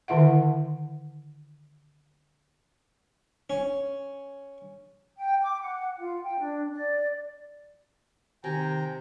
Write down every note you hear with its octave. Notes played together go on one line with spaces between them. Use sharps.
D3 D#3 E4 E5 F#5
C#4
G5
D6
F#5
F4
G5
D4
D5
C3 D#3 G5 G#5 A#5